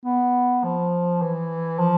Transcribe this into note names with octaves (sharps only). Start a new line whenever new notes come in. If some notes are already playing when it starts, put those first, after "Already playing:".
B3
F3
E3
F3